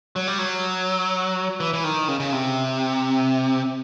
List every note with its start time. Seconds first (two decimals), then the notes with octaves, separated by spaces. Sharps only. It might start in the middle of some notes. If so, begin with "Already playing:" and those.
0.16 F#3
0.27 G3
0.39 F#3
1.60 E3
1.74 E3
1.84 D#3
2.08 C#3
2.20 C#3
2.32 C3